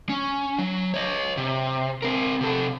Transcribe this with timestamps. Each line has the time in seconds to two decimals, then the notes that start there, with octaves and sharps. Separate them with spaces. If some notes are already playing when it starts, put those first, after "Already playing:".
0.09 C#4
0.59 F#3
0.94 C#5 D#5
1.37 C3
2.02 C4 A#4
2.41 C3 A4